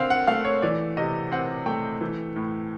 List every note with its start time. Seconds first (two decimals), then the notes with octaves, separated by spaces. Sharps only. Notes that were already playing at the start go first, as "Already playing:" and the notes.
Already playing: D3 C4 F5
0.10 F#5
0.27 A3 F5
0.45 C#5
0.62 E3 D5
0.97 C3 D#5
1.32 C4 F#5
1.66 A3 G5
2.01 E3
2.36 A2